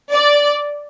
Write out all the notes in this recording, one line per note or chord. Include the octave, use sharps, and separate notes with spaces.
D5